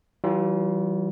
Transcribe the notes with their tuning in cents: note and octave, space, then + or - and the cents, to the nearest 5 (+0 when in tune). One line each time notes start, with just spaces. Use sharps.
E3 +0 G3 -45 F4 +0